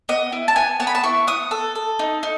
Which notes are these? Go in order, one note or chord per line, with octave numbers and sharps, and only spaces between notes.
B3 D#5
E4
A5
B3 G#5
B3 A5
B5
A5
E4 C#6
B3 D#6
A4
A4
D#4
D#4